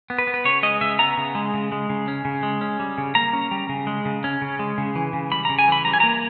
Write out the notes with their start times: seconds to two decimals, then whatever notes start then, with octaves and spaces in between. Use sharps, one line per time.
0.10 B3
0.18 B4
0.27 B3
0.34 B4
0.45 C#3 C#5
0.63 G#3 D#5
0.81 C#3 E5
0.99 B3 A#5
1.17 C#3
1.35 G#3
1.54 C#3
1.72 G#3
1.89 C#3
2.08 C#4
2.25 C#3
2.43 G#3
2.61 C#4
2.80 G3
2.98 C#3
3.15 A#3 A#5
3.33 C#4
3.51 G3
3.69 C#3
3.87 G#3
4.05 C#3
4.24 C#4
4.42 C#3
4.59 G#3
4.78 C#3
4.95 E3
5.13 C#3
5.32 G3 B5
5.45 C#3 A#5
5.59 G#5
5.68 E3 B5
5.85 G3 A#5
5.93 G#5
6.00 A#3 A#5